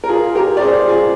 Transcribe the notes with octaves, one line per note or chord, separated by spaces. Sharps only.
A#4
F4 G#4
G4 A#4
D5
G#4 C5
F4 G#4